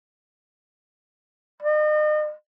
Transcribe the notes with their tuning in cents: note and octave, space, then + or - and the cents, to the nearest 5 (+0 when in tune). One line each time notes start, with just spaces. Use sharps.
D#5 -40